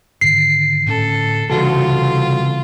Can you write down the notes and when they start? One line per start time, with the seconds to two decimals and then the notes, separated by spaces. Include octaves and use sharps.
0.21 G#2 D3 D#3 C7
0.87 A2 D3 C#4 A4
1.50 C2 C#3 E3 F4 F#4 A4